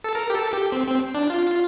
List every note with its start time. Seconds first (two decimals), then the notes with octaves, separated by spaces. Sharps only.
0.04 A4
0.15 A#4
0.30 G4
0.35 A4
0.53 G4
0.72 C4
0.87 C4
1.15 D4
1.30 F4